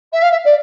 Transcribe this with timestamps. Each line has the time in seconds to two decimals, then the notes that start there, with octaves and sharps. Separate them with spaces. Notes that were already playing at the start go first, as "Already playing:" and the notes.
0.12 E5
0.22 F5
0.31 E5
0.45 D5